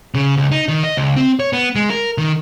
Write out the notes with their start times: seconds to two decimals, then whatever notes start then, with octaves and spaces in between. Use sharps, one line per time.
0.14 C#3
0.37 C#2
0.52 D#4
0.68 D#3
0.83 D#5
0.97 C#2
1.16 C4
1.40 C#5
1.53 B3
1.76 G#3
1.90 A#4
2.18 D#3